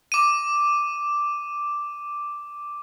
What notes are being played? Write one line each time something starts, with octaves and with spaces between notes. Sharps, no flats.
D6 D#7